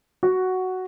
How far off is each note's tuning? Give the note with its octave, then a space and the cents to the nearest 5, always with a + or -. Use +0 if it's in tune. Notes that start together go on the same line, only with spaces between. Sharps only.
F#4 +5 F#5 +0